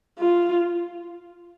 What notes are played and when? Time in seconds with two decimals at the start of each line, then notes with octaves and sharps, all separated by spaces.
0.18 F4